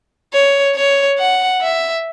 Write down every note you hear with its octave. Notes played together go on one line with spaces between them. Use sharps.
C#5
C#5
F#5
E5